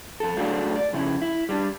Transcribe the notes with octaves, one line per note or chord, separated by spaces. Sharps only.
F2 A4
F#3 G#3 A3 D4 A4 F5
D5
F2 C#3 E4
E4
G3 D4